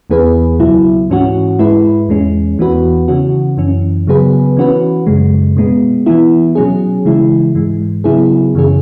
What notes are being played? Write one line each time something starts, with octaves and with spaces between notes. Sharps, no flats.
E2 E3 B3 G#4 B4
C#2 B2 F#3 E4
G#2 E3 C#4 F#4
G#2 G#3 E4 B4
E2 E3 G#3 C#4
E2 E3 B3 F#4 B4
C#3 E3 C#4 F#4
F#2 E3 C#4
C#3 F#3 B3 G#4 B4
E3 C#4 F#4 B4
F#2 C#3 G#3
B2 G#3 B3
E3 B3 E4
B2 F#3 C#4 G#4
C#3 E3 G#3 E4
G#2 E3 G#3
C#3 F#3 B3 E4 G#4
F#2 C#3 E3 C#4 G#4